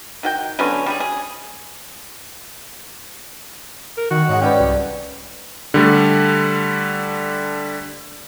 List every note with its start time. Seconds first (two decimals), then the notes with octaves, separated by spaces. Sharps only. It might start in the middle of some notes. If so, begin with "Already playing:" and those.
0.23 D#3 F#4 G5
0.59 D3 F#3 B3 C#4
0.86 G3 F4 G#4
1.00 G#4
3.98 A#4
4.11 D#3 F#4
4.29 G#2 C#5 D#5 F#5
4.41 C#4 B4 D5 G5
4.60 C2
5.74 D3 G3 A3